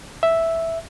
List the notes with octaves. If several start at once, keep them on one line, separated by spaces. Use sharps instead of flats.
E5